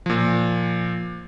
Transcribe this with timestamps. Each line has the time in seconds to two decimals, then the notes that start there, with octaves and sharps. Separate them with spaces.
0.06 A#2 F3